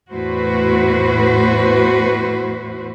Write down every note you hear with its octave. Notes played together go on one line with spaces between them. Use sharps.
E2 A2 E4 F#4 B4 C5